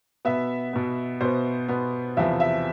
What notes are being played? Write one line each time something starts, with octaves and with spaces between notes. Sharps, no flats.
B2 B3 E5
B2 B3
B2 B3 C5
B2 B3
E2 C3 F3 B3 E5
E5